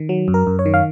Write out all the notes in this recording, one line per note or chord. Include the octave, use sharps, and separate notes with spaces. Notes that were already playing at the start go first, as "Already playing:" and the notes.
Already playing: D#3
F#3
F#2
A#4
F#2
C#5
D#3
F5